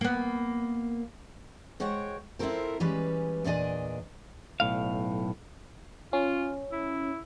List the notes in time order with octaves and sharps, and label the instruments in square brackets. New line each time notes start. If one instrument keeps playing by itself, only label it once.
[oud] A#3 B3
[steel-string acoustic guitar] G#3 F#4 C5 C#5 F#5 G5
C4 E4 F4 A4 A#4 C5
E3 G3 G#3 C#4 B4
E2 A#2 D4 D5 D#5 G#5
[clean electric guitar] B1 A2 F5
[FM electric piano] C#4 [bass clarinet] F4
[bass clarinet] E4